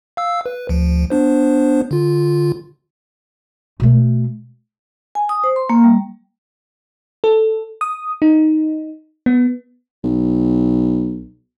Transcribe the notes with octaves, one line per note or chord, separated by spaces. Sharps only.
F5 E6
B4
D2 F3
B3 D4 C5
D3 F4
B2 A3
G#5
D#6
C5
C6
A#3
G3
A4
D#6
D#4
B3
B1